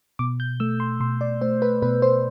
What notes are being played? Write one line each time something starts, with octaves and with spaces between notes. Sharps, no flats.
B2 D6
G6
A3 E6
C6
B2 C6
D5
A3 C5
B4
B2 B4
C5